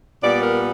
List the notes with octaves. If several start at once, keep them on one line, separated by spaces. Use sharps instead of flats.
A#2 G3 B3 D5
A#4